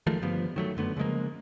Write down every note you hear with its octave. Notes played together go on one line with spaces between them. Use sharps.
D#3 F3 G#3 A3
G2 D3 F3 B3
D#3 F#3 A3
F#2 D3 A3 B3
C#3 F3 G#3 A#3